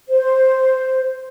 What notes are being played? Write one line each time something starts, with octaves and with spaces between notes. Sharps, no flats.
C5